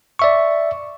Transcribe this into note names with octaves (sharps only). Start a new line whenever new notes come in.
D5 E5 C#6